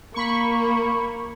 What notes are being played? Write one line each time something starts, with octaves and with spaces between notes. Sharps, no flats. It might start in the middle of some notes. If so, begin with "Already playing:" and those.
A#3 B5 C#6